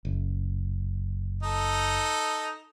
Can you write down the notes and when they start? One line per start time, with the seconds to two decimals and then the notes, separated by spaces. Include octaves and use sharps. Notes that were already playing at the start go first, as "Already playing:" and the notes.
0.05 F#1
1.43 D#4 A4